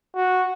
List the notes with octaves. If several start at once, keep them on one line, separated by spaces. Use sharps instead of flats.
F#4